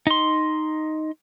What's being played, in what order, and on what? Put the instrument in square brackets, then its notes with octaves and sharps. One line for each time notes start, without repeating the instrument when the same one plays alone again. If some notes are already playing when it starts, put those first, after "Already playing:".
[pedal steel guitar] D#4 C6